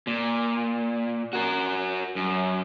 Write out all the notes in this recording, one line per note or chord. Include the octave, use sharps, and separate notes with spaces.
A#2
F#4 A#4
F#2